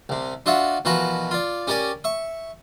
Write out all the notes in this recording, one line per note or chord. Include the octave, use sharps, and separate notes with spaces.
C2 C3
D4 F4 F#4 E5 F#5
B2 E3 F3 F#4 A#4 B4
F4 D5
C#4 G4 A#4 D5 G#5
E5 C#6